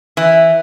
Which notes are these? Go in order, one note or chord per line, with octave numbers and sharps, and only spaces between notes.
E3